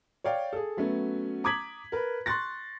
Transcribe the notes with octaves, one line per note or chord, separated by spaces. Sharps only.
C#5 D5 F5 G5
G#4 A4
F#3 A3 B3 C#4
A#5 D6 D#6 G#6 B6 F#7
A#4 B4
C6 C#6 F#6 A6 A#6